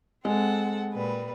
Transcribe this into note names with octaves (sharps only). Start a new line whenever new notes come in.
G#3 C4 A4 F#5
A#2 G3 B4